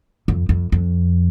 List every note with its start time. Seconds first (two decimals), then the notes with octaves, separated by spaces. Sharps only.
0.28 F2
0.49 F2
0.72 F2